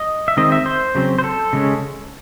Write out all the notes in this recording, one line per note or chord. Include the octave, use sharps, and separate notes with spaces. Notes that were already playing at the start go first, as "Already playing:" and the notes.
Already playing: D#5
E5
D#3 G#3 C4 D#5
E5
C5
C#3 F#3 C4
C5
A4
C#3 G#3 C#4